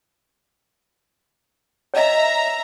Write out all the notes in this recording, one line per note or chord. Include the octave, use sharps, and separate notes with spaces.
C#5 D#5 E5 A#5